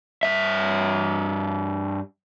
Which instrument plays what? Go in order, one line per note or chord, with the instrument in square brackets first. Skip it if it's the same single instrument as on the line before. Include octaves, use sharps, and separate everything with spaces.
[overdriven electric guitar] G2 E5